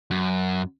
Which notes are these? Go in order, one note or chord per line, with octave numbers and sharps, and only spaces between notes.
F#2